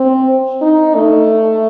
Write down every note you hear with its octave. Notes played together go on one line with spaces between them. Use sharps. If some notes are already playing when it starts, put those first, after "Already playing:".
Already playing: C4
D#4
A3